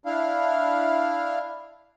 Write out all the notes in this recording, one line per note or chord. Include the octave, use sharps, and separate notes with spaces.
D4 E4 F5